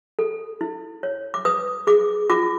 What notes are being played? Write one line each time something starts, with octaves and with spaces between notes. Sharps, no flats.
A4
E4
C#5
D6
B4 D#6
G#4 D6
F4 D6